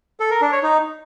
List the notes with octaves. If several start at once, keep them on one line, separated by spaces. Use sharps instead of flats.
A4
A#4
D4
C#5
D#4